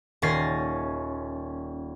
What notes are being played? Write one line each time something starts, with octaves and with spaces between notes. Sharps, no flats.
D#1 C#4 A6 A#6 C7